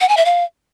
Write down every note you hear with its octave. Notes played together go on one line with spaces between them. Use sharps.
F#5
G#5
E5
F5